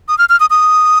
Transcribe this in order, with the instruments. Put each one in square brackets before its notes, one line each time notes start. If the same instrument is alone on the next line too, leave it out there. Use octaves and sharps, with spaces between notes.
[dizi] D#6
F6
F6
D#6
D#6